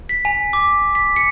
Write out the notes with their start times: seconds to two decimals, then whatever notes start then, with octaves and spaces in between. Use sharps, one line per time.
0.09 B6
0.25 G#5
0.53 D6
0.95 B6
1.16 C#7